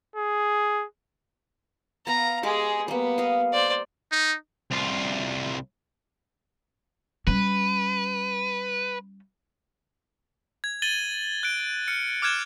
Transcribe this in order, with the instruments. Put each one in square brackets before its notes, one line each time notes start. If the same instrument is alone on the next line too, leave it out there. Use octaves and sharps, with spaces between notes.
[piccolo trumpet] G#4
[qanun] B3 F5 [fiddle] A#5
[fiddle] G#3 G#4 [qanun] G4 D6
[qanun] G3 A#3 [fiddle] B3
[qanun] D#5 F5
[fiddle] C5 D5
[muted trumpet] D#4
[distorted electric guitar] C2 F4
[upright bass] G3 C#4 [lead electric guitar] B4
[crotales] G#6
A6 D#7 F#7 G7
F#6 D7
F6 C#7
D6 F6 F#6 G#6 E7